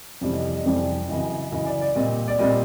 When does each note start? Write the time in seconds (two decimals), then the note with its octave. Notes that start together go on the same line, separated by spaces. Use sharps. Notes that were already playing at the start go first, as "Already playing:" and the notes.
0.21 F2 C3 E3 G3 D5
0.34 D#5
0.45 D5
0.55 D#5
0.66 F2 C3 E3 G3 D5
1.08 F#2 C#3 E3 D#5
1.52 F#2 C#3 E3 D#5
1.66 D5
1.81 D5
1.95 A#2 G3 C4 D#5
2.28 D5
2.39 A#2 G3 C4 D#5